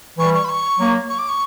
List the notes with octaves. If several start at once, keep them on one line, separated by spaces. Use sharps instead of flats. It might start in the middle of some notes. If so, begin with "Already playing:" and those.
E3 G3 C#6
C#6
B5
C#6
F#3 A#3
C#6
D6
C#6